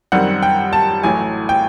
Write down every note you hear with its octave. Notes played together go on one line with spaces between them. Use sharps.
F#2 D#3 G3 C4 F#5
G5
A5
A1 A2 F#3 G#5
G5